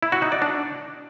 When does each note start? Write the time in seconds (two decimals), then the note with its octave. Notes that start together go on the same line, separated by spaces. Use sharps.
0.03 E4
0.12 F#4
0.22 D#4
0.32 D5
0.42 D4